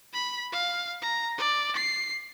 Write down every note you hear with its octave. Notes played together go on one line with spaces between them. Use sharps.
B5
F5
A#5
D5
C7